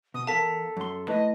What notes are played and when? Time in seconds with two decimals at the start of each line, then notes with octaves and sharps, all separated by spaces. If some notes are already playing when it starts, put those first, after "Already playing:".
0.14 B2 D#6
0.27 E2 A4 A#4 F5 A5 B6
0.77 F#2 C6
1.08 A3 E4 B4 D#5